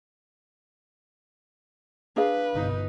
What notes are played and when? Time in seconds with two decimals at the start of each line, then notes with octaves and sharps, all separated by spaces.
2.16 D4 G#4 B4 F5
2.55 G1 D#4